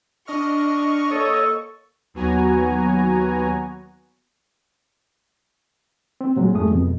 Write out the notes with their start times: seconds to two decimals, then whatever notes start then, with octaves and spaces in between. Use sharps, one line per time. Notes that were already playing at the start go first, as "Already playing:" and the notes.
0.27 D4 D#5 C#6 F6
1.11 A#3 A4 C#5 D#5
2.14 D#2 F#3 B3 F#4 G#5 A#5
6.21 C4
6.36 A#2 F#3 G#3
6.54 F2 G#2 G3 A3 G#4 D#6
6.71 F2 B2